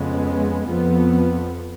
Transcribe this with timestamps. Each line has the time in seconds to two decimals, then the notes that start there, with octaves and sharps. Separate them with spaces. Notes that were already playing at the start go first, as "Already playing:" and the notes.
Already playing: F2 C#3 G#3 B3
0.66 F2 F3 B3